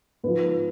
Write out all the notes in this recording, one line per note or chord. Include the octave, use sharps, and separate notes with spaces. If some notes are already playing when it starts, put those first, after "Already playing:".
G#2 F3 B3